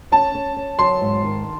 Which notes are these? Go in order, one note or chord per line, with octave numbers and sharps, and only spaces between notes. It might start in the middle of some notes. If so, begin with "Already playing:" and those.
C#4 A5
C#4
C#4
F#3 C6
G#2
D#3